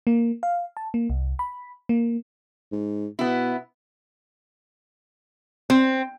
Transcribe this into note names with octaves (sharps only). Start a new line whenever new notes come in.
A#3
F5
A5
A#3
C2
B5
A#3
G#2
B2 B3 E4
C4